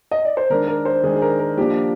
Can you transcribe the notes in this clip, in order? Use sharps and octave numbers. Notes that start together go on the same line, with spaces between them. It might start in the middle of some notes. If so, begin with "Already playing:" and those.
D#5
D5
C5
D#3 G#3 D4 A#4
A#4
C5
D#3 G#3 D4 G#4
G#4
A#4
A#4
F3 A#3 D4 G4